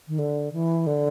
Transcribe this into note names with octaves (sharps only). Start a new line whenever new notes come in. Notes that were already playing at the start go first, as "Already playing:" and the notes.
D#3
D3
E3
D3